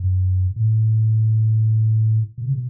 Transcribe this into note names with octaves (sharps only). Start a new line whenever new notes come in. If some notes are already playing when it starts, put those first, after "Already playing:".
Already playing: F#2
A2
B2
C#3
B2